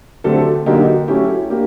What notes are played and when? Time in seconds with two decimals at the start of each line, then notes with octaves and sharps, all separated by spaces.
0.24 D3 F#3 A3 C4 G4 A4
0.66 D3 F#3 A#3 D#4 G4
1.08 F#3 A3 C#4 E4 G4
1.50 A#3 D4 G4